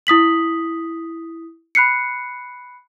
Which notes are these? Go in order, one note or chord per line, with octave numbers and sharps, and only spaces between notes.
E4 D#6 B6 F#7
B5 F#6 C7 C#7